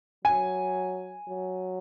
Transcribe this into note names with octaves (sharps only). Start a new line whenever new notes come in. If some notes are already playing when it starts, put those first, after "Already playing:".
F#3 G#5
F#3